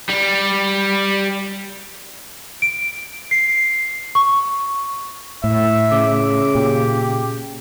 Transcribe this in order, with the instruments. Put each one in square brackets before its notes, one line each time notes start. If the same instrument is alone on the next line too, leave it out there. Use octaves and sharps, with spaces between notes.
[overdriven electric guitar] G3
[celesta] D7
C7
C#6
[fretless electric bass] A2 [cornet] E5
[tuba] C#3 [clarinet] D6
[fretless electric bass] A#2 [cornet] G4